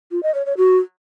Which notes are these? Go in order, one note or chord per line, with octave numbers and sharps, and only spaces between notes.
F4
D#5
C#5
C#5
F#4